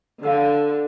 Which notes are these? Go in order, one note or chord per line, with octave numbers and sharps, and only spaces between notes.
D3 F5 F#5 E6